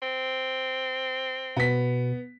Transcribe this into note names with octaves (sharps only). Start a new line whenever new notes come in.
C4
B2 B3 B6